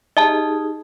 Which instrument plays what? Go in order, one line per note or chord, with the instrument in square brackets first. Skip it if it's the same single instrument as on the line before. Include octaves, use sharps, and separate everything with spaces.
[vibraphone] D#4 G4 G#4 [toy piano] D#5 A5